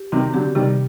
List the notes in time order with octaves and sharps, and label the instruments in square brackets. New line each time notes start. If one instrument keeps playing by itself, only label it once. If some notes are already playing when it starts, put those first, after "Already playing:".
Already playing: [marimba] G4
[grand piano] C3 D#3 [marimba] C4
[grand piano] D3 F#3 [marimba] G4
[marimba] C3 [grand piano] D#3 G3